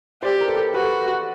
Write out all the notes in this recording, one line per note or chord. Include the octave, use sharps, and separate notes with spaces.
G4 C5 D5
A#4
A4 B4
F#4 A4 B4